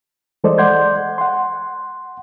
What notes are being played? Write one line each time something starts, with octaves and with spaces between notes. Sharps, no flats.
E3 G#3 A4 C5 D5 D#5
D5 F#5 C6 G6 G#6
F#5 C6